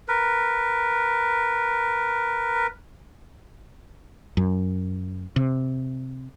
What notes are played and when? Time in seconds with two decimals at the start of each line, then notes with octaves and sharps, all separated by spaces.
0.08 A#4 B4
4.37 F#2
5.36 C3